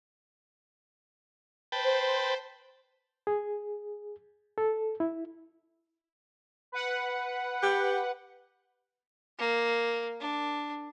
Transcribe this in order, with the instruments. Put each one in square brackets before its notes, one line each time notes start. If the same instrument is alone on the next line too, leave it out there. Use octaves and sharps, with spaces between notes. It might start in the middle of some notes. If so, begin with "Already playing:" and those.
[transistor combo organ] B4 G5 A5 [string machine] C5
[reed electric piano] G#4
A4
E4
[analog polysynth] B4 F#5
[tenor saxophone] G4
[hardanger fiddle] A#3
D4